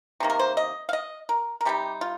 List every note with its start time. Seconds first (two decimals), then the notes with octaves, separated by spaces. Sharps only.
0.20 C3 D#3 A#3
0.30 A#4
0.39 C5
0.57 D#5
0.89 F5
0.93 D#5
1.29 A#4
1.61 A#4
1.65 C3 G3 D#4 G4
2.01 F4